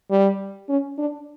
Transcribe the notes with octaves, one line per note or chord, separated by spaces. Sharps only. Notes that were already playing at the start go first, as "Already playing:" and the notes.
G3
C#4
D4